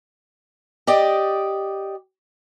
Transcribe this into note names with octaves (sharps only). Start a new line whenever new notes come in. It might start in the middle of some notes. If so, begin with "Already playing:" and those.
G4 D5 D#5